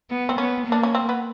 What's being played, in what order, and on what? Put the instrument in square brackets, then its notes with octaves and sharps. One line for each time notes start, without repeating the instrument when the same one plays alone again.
[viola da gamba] B3
[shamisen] C4
[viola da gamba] B3 [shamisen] C#4
[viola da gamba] A#3
[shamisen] D4
C#4
C4
B3